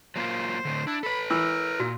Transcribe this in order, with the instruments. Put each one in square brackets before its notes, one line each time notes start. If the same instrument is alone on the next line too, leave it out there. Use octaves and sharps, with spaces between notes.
[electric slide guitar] F#3 A#3 F4 [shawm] C5
[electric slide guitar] A2 D3
[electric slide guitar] D4 [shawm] E4
[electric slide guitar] A4 B4 [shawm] B5
[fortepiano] E3 [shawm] A#4 [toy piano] E6
[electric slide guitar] A#2 [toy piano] F#4